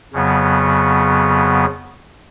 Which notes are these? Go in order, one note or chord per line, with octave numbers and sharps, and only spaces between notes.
F2 C#3 F#3 B3